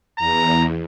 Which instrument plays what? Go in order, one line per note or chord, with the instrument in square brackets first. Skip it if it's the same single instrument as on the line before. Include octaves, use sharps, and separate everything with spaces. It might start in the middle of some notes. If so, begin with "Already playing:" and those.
[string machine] E2 [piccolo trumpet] A#5